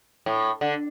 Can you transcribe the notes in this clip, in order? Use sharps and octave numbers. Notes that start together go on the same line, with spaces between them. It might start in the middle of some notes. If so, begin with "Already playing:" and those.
A2
D3